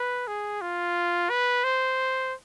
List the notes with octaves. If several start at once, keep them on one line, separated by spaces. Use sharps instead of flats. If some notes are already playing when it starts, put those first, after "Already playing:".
Already playing: B4
G#4
F4
B4
C5